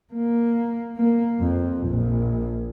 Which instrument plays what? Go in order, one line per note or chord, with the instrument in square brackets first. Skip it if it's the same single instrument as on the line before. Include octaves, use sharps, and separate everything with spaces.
[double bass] A#3
A#3
F2
A#1